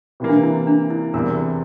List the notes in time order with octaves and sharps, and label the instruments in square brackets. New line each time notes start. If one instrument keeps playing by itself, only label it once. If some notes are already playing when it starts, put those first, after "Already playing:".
[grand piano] C3 E3 A#3
[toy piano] D4
E4
D4
E4
[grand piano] E2 C3 G3 [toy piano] A#4